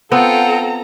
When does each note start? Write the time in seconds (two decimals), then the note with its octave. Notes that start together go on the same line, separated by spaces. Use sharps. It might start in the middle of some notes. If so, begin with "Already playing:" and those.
0.12 B3 C4 F4 A4 F#5 G5 A#5